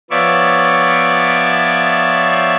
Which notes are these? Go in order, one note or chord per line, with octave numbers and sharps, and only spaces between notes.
F3 B3 C#5 D5 E5